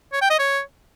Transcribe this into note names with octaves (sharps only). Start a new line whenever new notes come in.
C#5
G5
D#5
C#5